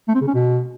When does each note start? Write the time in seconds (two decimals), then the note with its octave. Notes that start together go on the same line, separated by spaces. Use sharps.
0.08 A3
0.15 C4
0.21 C#3
0.28 C#4
0.34 B2